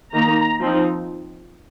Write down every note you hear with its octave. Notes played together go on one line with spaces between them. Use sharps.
D#3 A#3 D#4 A#5
F3 C4 D#4